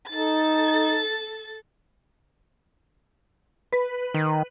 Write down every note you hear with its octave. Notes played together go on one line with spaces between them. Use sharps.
D#4 A4 A6
B4
D#3